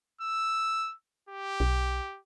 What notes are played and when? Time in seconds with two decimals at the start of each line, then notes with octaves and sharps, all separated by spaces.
0.21 E6
1.29 G4
1.60 B1